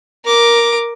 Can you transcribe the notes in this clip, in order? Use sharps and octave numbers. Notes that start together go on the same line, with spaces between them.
A#4 D6